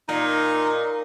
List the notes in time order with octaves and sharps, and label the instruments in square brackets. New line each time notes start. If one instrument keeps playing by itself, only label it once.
[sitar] A#2 [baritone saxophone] D#4